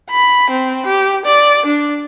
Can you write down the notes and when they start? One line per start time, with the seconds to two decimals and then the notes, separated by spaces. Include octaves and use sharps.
0.10 B5
0.50 C4
0.86 G4
1.25 D5
1.65 D4